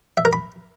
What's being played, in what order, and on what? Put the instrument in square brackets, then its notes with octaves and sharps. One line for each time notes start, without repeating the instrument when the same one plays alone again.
[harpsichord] E5
A#4
B5